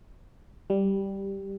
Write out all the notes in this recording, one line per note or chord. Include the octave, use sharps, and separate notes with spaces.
G3